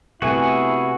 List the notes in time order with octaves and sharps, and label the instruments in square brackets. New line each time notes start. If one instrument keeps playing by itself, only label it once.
[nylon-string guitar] C3 A3 B3 [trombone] E4 [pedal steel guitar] F#4 G#4 G#5